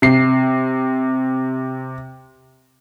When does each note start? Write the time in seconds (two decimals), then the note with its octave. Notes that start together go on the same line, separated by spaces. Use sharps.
0.02 C3 C7